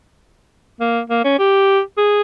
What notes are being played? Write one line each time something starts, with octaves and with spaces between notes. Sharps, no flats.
A#3
A#3
C#4
G4
G#4